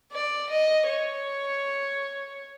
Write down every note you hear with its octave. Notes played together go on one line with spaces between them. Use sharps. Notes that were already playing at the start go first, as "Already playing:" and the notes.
D5
D#5
C#5